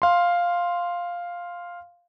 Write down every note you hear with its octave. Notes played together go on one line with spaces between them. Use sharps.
F5 C6